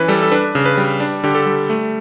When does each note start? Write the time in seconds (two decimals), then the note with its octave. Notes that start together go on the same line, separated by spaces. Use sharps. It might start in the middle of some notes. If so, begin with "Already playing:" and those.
Already playing: E3 C#4 B4
0.08 G3 A4
0.23 A4
0.32 D4 B4
0.55 C#3
0.65 B4
0.77 G3
1.00 D4
1.24 D3 G4
1.35 A4
1.46 G3
1.70 A3